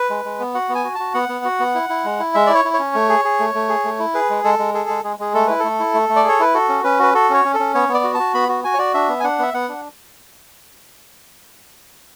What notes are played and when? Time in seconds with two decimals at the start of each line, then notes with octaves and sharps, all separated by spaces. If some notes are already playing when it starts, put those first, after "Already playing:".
Already playing: B4
0.10 G#3
0.25 G#3
0.40 B3
0.54 F#4 F#5
0.69 B3
0.75 G#5
0.84 F#4
0.95 F#4 A5
1.14 B3 F#5
1.29 B3
1.45 F#4
1.60 B3
1.75 E4
1.89 E4
2.04 G#3
2.19 E4
2.35 G#3 E5
2.47 E4 D5
2.55 C#5
2.65 E4
2.74 C#5
2.79 C#4
2.95 A3
3.09 G#4
3.25 G#4
3.39 A3
3.55 A3
3.69 G#4
3.85 A3
3.99 E4
4.14 G#4 B4
4.30 G#3
4.44 G#3 A4
4.59 G#3
4.74 G#4 A4
4.89 G#3
5.04 G#3 G#4
5.19 G#3 G#4
5.34 A3 A4
5.47 E4 B4
5.60 A3 A4
5.80 E4
5.94 A3
6.09 A3
6.16 D5
6.24 G#4 C#5
6.40 E4 B4
6.54 F#4 A4
6.69 C#4
6.84 C#4 B4
6.99 F#4 B4
7.14 F#4 A4
7.30 C#4 C#5
7.45 C#4
7.54 A4
7.60 C#4
7.74 B3 C#5
7.89 B3
7.94 D5
8.04 F#4
8.14 F#4 A5
8.34 B3 B5
8.49 F#4
8.64 F#4 G#5
8.74 C#5
8.79 F#4 D5
8.94 D4 E5
9.09 B3
9.20 G#5
9.24 D4 F#5
9.39 B3 E5
9.54 B3 F#5
9.69 D4